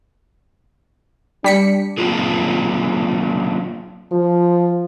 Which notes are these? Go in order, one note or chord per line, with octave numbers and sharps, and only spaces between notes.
G3 D4 B6 C#7
F#3 A#3 C4 D4 F4 G#4
F3